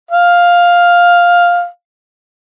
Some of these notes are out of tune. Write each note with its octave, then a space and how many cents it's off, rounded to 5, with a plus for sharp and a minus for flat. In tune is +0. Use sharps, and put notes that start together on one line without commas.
F5 +5